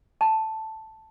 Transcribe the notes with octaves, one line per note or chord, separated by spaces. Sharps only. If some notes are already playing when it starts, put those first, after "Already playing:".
A5